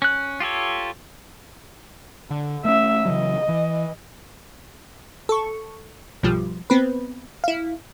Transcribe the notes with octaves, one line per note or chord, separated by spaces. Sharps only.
C#4 F#6
F4 G4 A4 C#5
D3
A3 A#3 C#4 E5
C#3 E3 F#3 D#5
E3
A4 C#6
B1 G2 F3 G3
B3 C4 B4
E4 F5